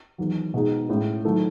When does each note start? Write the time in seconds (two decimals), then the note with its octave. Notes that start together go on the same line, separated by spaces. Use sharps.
0.18 E2 D#3 F#3
0.54 B2 G#3 D#4 G#4
0.89 A2 G#3 C#4
1.24 D#3 F#3 A3 E4